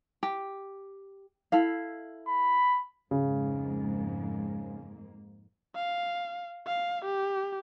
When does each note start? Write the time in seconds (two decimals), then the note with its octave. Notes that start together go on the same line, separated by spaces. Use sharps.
0.23 G4
1.52 E4 A4 F5
2.28 B5
3.11 F2 G#2 C#3 A#3
5.75 F5
6.67 F5
7.05 G4